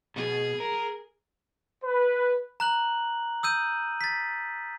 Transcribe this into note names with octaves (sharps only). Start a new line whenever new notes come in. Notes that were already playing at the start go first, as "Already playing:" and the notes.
B2 G#4
A#4
B4
A#5 F#6 F#7
D#6 E6 G6 D#7
A6 B6